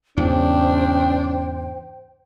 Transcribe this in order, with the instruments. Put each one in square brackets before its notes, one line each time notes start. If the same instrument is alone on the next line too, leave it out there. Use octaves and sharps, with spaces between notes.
[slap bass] E2 G#2 C#3 [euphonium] C#4 [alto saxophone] D4 [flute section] C5 G5